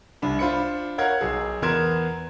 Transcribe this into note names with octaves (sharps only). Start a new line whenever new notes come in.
C2 D4 B5
D4 F4 C5 B5 C#7
A#4 C#5 F5 F#5 G#6
B1 G#4
E2 B3 A#4 C6 G#6 E7